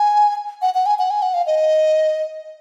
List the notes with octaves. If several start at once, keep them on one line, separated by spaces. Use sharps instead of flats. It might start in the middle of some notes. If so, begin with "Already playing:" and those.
Already playing: G#5
F#5
F#5
G#5
F#5
G#5
F#5
F5
D#5